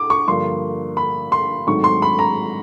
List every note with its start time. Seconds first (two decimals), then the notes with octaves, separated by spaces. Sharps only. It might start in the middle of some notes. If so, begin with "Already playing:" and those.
Already playing: A2 D6
0.10 C#6
0.28 G2 D3 F3 A#3 C6
0.97 B5
1.32 C6
1.67 G#2 D#3 F#3 A3 C4 C#6
1.84 C6
2.02 B5
2.19 A#5